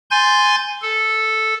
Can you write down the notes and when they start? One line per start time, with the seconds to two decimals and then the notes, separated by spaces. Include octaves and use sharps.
0.11 G#5 C6 G6 A6
0.82 A4